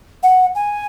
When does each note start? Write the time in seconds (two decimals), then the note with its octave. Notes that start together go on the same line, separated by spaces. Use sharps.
0.23 F#5
0.55 G#5